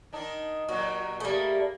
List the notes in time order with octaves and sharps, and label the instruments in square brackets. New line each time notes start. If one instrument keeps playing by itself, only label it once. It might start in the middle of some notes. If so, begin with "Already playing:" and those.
[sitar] D#3 D4 D#4
[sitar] A#2 F#3 G3 [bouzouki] F#4
[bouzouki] G3 A3 [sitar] A#3 G#4